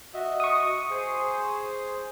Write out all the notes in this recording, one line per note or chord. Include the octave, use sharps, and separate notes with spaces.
F#4 D#5 E5
C#6 D#6
G#4 C5